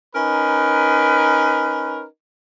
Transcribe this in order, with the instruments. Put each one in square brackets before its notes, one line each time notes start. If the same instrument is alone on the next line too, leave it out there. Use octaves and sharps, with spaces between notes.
[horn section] C#4 D#4 A#4 B4